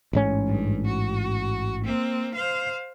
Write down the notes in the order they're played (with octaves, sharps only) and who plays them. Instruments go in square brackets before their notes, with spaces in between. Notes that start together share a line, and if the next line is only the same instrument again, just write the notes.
[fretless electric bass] A1 G#2 C#4
[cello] G2
F#4
A#3 C4
C5 F5